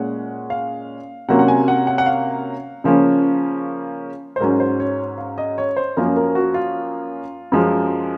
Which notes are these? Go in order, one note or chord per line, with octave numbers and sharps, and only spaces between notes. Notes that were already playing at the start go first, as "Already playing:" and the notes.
Already playing: A#2 G#3 C#4 F#5
F5
C3 F#3 A#3 C#4 F#5
F#5
G#5
F#5
F#5
F#5
F5
C#3 F3 A#3 C#4
C5
G#2 F#3 C#4 A#4
C5
C#5
F5
D#5
C#5
C5
F#2 F3 A#3 C#4 A#4
A#4
F#4
F4
F#2 F3 G#3